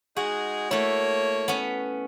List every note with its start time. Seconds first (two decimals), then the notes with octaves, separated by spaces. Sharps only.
0.16 G#3 D#4 F#4 G#4
0.71 A3 A#3 E4 C#5
1.48 B3 C#4